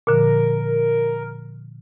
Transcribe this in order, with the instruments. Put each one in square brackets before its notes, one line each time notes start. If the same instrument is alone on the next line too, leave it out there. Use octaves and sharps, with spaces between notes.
[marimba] A#2 D3 F3 [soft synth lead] A#4